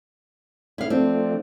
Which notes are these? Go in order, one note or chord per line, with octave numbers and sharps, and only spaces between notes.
E4 F5
F3 A3 C4 D4